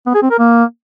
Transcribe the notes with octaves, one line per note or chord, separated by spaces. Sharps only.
B3
G#4
C4
A#4
A#3